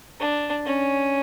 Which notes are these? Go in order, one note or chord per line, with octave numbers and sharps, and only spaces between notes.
D4
C#4